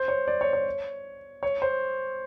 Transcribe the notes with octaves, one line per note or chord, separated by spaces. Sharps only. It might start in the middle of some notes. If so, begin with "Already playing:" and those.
Already playing: C5
C#5
D5
C#5
C#5
C#5
C5